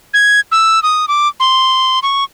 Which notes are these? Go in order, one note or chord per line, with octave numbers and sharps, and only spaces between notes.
G#6
E6
D#6
D6
C6
C#6